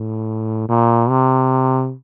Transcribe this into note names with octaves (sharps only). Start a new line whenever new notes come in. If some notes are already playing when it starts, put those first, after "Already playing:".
Already playing: A2
A#2
C3